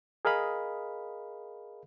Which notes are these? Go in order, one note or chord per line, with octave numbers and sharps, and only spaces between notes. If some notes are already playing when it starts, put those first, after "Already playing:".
G#4 A#4 D#5 F5 B5